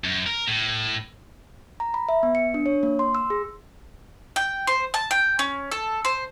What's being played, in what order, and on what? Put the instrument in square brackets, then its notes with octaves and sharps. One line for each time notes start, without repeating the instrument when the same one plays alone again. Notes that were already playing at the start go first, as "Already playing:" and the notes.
[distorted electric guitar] F#2
A#4
A2
[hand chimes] A#5
B5
E5
B3
C#7
D4
C#5
A#3
C6
E6
G#4
[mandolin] G5
C5
A5
G5
C#4
A4
C5